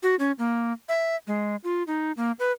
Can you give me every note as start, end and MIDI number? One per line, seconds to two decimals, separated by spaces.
0.03 0.15 66
0.19 0.32 61
0.39 0.73 58
0.89 1.16 76
1.27 1.56 56
1.64 1.83 65
1.87 2.12 63
2.17 2.32 58
2.39 2.52 71